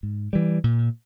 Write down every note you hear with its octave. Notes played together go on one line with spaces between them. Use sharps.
G#2
E3 G3
A#2